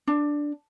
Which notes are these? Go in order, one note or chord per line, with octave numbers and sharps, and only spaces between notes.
D4